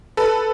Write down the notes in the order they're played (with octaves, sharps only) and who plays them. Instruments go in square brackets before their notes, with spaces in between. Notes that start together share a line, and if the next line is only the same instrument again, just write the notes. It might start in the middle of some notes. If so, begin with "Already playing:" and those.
[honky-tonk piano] A4 B4